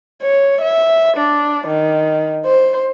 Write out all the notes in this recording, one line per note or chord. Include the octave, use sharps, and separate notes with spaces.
C#5
E5
D4
D#3
C5